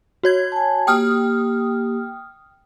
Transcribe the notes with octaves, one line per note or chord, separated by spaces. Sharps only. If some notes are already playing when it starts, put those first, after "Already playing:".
F#4 C#5 G#6
G#5 A5
A#3 G4 G5 D#6 F6